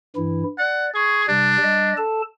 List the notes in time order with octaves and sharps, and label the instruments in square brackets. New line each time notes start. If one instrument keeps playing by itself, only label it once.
[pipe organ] G2 E3 E4
[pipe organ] D5 [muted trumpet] F#5
[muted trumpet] G#4 [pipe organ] C#6
[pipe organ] C3 G3 [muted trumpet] D4
[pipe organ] G3 D#5
A4 A5